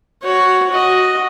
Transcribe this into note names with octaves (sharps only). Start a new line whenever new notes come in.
F#4 C#5
F#4 D#5